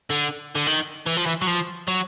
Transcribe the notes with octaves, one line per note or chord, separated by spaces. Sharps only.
D3
D3
D#3
E3
F3
E3
F#3
F3
F#3